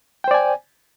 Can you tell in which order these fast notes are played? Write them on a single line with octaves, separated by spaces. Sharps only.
G5 C5 D5 G#5